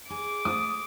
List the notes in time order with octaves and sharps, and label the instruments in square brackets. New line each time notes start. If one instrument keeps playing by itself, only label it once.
[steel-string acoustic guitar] G#4 [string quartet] D6
[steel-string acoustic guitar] A3 [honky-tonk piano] D#6